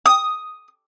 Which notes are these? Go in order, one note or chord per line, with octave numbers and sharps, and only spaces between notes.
D#6